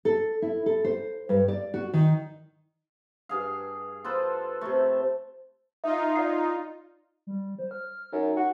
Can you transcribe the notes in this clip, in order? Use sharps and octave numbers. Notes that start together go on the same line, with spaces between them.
A4
E4
A4
C5
G2
D5
F#4
D#3
G2 G#4 F5
F4 A4 B4 C5
C3 A3
D#4 F4 E5
D5 F5 C7
G3
C5
F6
F#2 D#4
F#4